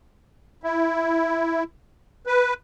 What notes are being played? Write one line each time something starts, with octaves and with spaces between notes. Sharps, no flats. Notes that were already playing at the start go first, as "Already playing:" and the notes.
E4
B4